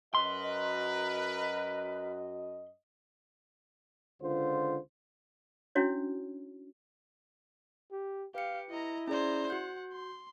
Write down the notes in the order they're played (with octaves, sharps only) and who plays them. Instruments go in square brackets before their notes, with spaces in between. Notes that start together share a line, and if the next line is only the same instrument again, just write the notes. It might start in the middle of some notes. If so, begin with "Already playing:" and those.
[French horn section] F#2 F#4 D#5 [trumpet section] A#4 B4 [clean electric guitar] C6
[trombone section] C#2 D3 F4 C5
[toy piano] C#4 D4 E4 F#4 C#5
[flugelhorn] G4
[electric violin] G4 [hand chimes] B4 C#7 [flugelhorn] F5
[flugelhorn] E4 [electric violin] D#5 A#5
[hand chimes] C#4 G#4 D5 [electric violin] C5 A#5
[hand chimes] F#4 G6 [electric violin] F#5
[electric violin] C6